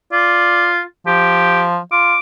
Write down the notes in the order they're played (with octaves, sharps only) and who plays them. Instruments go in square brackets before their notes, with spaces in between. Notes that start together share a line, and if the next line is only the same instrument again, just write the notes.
[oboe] F4 [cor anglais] D5
[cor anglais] F3 [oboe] G4
[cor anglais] F4 [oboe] D6